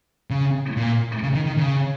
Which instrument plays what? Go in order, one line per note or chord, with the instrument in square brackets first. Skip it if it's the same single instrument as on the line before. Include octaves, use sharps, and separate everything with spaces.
[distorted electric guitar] C#3
A#2
C#3
D#3
D#3
C#3